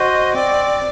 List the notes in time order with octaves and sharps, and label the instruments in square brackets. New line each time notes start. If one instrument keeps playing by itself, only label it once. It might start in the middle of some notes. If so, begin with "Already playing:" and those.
Already playing: [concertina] F#4 C5 [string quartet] D#5
[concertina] C4 [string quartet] D5